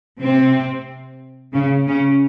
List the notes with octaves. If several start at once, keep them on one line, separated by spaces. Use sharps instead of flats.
C3 C4
C#3 C#4
C#3 C#4